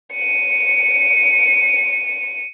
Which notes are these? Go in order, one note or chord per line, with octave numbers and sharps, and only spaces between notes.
C#7 D#7